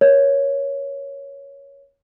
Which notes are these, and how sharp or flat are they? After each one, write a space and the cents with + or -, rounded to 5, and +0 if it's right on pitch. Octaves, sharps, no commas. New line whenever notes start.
A#4 +30 C#5 +5